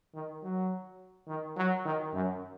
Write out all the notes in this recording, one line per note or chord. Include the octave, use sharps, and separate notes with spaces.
D#3
F#3
D#3
F#3
D#3
F#2